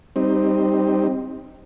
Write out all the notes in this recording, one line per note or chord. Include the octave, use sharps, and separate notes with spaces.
G3 C4 D#4